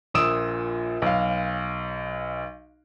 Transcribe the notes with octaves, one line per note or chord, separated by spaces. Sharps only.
A#1 A#2 D#6 E6 D7 E7
B1 F5